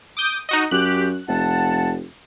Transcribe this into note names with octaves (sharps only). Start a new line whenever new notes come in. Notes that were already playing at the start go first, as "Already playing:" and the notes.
D6 D#6 G6
D#4 F#4 D#5
F#2 G4 F#6
F1 F#5 A5